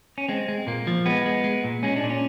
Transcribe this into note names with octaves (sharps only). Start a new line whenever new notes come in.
C#4
G#3 C4
G#3
A#2 A#3
F3
G#3 B3
G#3
G#3
A#2
G#3 C#4
D4
A#2
C#4